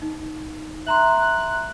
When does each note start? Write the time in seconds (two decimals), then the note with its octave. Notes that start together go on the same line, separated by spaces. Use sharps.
0.02 D#4
0.86 E5 A#5 C6 F#6